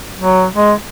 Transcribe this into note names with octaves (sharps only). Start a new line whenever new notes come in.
F#3
G#3